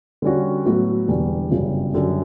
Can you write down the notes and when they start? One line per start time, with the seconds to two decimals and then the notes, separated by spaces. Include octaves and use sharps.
0.22 D3 G3 C#4 F#4
0.66 A2 F#3 B3 F#4 A4
1.08 E1 E2 D3 G3
1.51 G1 F#2 C#3 G3
1.93 F#2 D3 G3